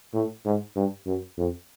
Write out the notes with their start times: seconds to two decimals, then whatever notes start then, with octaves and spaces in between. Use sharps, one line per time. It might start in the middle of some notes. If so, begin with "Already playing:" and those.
0.14 A2
0.45 G#2
0.76 G2
1.07 F#2
1.38 F2